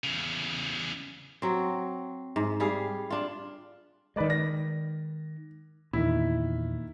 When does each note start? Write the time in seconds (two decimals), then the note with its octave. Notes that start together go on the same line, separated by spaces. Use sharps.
0.04 E2 C#3
1.42 F#3 C4
2.36 G#2
2.60 G3 G#4 F5
3.10 D4 F4
4.16 D#3 G#3 B4 D5 D#5
4.30 A#6
5.93 E2 A#2 D#3 E4